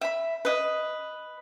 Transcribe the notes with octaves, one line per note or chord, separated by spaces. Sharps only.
E5 B5
B4 D#5